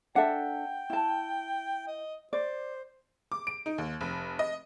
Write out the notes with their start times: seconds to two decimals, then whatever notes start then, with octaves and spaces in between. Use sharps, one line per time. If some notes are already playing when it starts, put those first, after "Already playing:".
0.16 D4 A4 E5 F#5 G5
0.90 E4 A5
1.88 D#5
2.33 C5 D5
3.32 D6
3.47 D7
3.66 D#4
3.78 D#2
4.01 F1
4.39 D#5